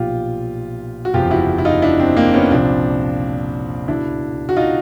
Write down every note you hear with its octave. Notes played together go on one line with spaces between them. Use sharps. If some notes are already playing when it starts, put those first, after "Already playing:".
Already playing: B1 A#2 F3 F4 G4
F#4
F#1 E2 C3 F3 F4 G4
E4 F#4
E4
D#4 F4
D4 E4
C4 D4
A#3 C4
B3 C#4
C2 A#2 F3 C4 D4
C#2 B2 D4 E4
F#4
D#4 F4